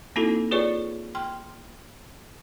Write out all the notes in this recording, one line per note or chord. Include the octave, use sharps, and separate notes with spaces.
A#3 C4 D#4 E4 F#4 A4
F4 G#4 B4 C#5 D5 C#6
G5 C6 F6